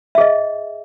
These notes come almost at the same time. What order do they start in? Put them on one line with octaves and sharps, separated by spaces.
E5 G#4 D#5